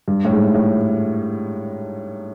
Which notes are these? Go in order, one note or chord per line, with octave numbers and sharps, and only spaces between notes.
G2
A2
G#2
A2